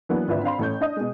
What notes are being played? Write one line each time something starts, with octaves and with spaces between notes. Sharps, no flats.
E3 F#3 A#3 B3 D4
G#1 D2 F4 B4 D5 E5
C4 D4 F5 B5 C6
A1 A3 C#5 G6
D4 D#5 D#6
B2 G#3